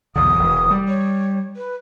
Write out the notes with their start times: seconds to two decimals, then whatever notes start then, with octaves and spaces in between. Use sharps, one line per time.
0.16 B1 E2 D3 D#6
0.35 E1 E3
0.71 G3
0.88 C#5
1.56 B4